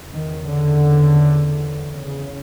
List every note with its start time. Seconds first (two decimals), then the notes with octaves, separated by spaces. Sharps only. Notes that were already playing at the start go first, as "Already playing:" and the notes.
Already playing: E2 C#3
0.13 D#3
0.49 D3
1.92 C#3